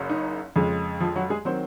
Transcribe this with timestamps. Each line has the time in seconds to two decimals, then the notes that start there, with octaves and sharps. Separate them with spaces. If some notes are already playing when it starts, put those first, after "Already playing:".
Already playing: F#1 F#2 C#3 F#3
0.10 D#4
0.56 F2 C#3 G#3
1.00 F3 F4
1.16 F#3 F#4
1.30 G#3 G#4
1.45 D#3 F#3 C4 C5